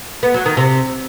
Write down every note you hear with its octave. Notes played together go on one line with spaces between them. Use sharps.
B3
F#3
D#3
C3